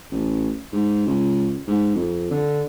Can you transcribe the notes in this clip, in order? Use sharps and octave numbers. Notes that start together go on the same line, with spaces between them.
A1
G#2
C#2
G#2
F2
D3